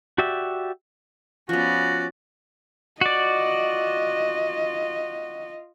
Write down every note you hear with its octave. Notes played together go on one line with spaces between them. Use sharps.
F#4 G4 D5 E5
F3 B3 C#4 F#4 D5
F4 F#4 D5 D#5